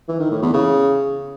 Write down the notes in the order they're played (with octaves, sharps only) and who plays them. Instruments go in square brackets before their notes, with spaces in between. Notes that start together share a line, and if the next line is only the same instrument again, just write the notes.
[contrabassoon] E3
D#3
A2
E2
C#3